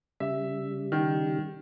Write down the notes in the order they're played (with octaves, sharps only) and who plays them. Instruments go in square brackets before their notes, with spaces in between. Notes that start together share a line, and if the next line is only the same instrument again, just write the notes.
[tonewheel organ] C#3 G3 [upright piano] E5
[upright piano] D#3